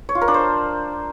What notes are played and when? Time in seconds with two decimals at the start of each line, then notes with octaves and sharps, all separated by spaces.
0.09 C#5
0.15 F4
0.21 A#4
0.28 D4
0.34 C5